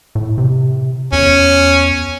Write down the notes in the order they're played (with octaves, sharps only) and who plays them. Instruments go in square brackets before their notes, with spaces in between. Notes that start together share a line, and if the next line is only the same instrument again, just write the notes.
[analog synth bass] A2
C3
[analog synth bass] E2 [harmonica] C#4